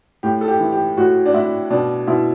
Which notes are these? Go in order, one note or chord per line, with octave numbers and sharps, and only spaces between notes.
A2 G4
A4
G4
E3
G4
A2 F#4
D4
A2 E4
B2 D4
B2 E4